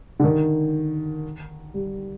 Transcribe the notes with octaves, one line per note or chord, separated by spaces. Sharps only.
D3
D#3
G3